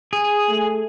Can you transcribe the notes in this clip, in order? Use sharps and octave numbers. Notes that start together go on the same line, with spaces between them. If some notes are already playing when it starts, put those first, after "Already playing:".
G#4
A3